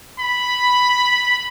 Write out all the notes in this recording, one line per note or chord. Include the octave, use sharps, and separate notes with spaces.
B5